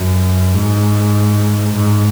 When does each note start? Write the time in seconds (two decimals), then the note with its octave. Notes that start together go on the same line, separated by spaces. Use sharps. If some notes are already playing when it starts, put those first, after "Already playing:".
Already playing: F#2
0.53 G#2
1.74 G#2